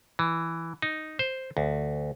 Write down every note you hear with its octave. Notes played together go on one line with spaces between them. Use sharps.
E3
D#4
C5
D2